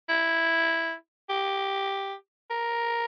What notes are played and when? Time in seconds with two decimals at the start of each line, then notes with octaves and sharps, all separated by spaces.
0.09 E4
1.30 G4
2.50 A#4